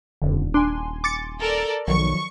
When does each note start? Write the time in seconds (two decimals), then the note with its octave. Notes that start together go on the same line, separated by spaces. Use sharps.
0.22 D#1 F2 D3
0.54 D4 G#5 C6
1.04 D6 A6 C#7
1.40 A4 A#4 D5
1.87 B1 D#3 F3 F#3 C#6